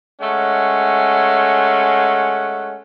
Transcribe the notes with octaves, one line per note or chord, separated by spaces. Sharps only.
G#3 A3 C#4 F#5